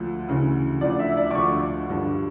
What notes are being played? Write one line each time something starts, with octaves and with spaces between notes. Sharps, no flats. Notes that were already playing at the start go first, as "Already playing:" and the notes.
Already playing: D2 D3 F3
D2 C#3 E3
D2 D3 F3 D5
E5
D5
D6
D2 D3 F3 C#6
G2 D3 F3